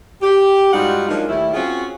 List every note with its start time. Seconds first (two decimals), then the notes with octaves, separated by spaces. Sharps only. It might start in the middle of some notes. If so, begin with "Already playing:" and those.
0.22 G4
0.73 G#2 G3 D#4 F4 F#4 F#5
1.09 F3 F#3 G#3 A#3 D4 D#4
1.29 D#2 G3 A3 E4
1.54 C4 C#4 F4 F#4 G#4